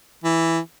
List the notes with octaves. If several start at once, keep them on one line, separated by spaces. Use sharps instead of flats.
E3